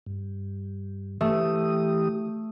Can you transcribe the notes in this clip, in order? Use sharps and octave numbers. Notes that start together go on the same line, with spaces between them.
G2
E3 A3 G4 D#6